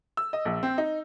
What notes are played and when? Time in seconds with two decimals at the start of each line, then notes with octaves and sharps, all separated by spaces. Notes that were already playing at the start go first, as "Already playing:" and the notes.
0.17 E6
0.33 D#5
0.45 A#1
0.63 C4
0.78 D#4